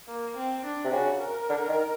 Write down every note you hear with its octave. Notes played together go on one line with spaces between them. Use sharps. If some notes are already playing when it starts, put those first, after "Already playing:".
A#3
C4
D4
C3
C#3 F#4
A#4
D3
D#3